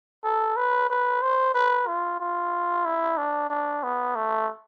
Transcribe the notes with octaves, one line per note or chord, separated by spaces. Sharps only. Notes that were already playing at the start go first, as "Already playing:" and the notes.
A4
B4
B4
C5
B4
F4
F4
E4
D4
D4
B3
A3